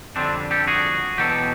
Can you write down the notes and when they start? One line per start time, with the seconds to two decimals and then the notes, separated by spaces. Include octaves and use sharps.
0.16 F2 D3 G3 C4 D4
0.51 G4 A4
0.67 F#4 G#4
1.18 E2 B2 F#3 G4 A4